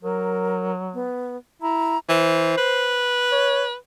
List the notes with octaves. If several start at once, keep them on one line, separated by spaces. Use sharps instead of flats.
F#3 A#4
B3
E4 A#5
E3 C5
B4
C#5